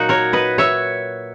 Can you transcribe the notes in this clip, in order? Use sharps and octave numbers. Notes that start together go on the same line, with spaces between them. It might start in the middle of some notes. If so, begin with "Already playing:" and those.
Already playing: A#2 F#3 A#3 D#4 F#4
A#4 C#5
B4 D#5
C#5 E5